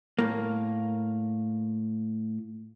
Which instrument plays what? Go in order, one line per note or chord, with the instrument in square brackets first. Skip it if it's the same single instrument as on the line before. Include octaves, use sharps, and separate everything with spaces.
[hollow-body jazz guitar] A2 A#3